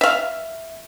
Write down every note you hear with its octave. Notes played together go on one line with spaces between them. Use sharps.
E5 F5